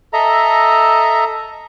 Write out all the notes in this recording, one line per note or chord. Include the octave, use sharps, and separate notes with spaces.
A4 D#5 E5 A#5